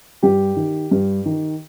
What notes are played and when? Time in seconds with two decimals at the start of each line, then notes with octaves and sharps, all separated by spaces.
0.23 G2 G4
0.57 D#3
0.91 G2
1.26 D#3